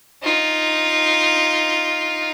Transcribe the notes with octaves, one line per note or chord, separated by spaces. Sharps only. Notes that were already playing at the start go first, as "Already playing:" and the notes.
D#4 F4